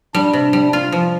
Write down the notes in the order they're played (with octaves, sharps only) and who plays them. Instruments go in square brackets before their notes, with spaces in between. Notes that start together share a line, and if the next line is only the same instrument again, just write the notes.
[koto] G3 [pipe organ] D4
[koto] C3
G3
F4
F3